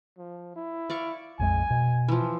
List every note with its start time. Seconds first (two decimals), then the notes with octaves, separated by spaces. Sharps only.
0.18 F3
0.56 E4
0.90 D5 F5 C#6
1.39 A#1 F2 G#3 G#5
1.70 B2
2.08 E3 F3